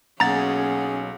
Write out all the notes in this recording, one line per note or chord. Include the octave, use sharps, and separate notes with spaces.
B1 A#3 C#4 G#4 F#5 A#5 G#6 A6